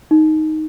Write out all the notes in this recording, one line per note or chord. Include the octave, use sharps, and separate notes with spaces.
D#4